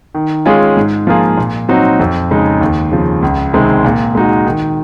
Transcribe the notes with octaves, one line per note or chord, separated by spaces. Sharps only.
D#3
G#3 C#4 F4 G#4
G#2
F3 A#3 F4 G#4
A#2
F#3 C4 D#4 F#4
F2
C#3 G#3 D#4
D#2
C#3 F3
C#2
C3 D#3 G#3 C4
A#2
G#3 D#4 F#4
D#3